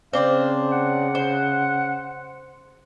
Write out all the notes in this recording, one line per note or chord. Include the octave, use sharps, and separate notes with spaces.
C#3 C4 D4 C5 F5
F#5
C5